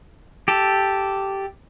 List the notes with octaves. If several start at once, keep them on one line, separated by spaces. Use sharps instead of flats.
G4 A4